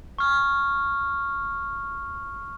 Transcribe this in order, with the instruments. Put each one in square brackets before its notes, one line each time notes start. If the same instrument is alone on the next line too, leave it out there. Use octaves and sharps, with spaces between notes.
[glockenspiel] C#6 F6